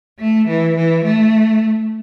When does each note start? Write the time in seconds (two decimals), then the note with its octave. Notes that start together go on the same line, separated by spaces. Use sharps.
0.19 A3
0.47 E3
0.76 E3
1.04 A3